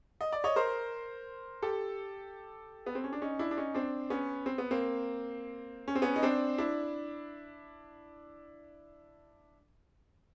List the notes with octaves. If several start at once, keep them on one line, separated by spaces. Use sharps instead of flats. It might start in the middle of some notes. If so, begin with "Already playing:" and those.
D#5
D5
C#5 D#5
A#4 C5
G4 A4
B3
C4
C#4
D4
C#4 D#4
D4 E4
D4
C#4 D#4
C4 D4
B3 C#4
C4
B3
A#3 C4
C#4
C4
B3 C#4
D#4
C4 D4
D4 E4